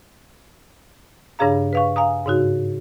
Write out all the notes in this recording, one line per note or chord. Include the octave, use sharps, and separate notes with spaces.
G2 C#3 D4 G#4 F5 A#5
B4 F5 C#6
F5 G#5 A#5 D#6
G#2 C#3 D#4 F#4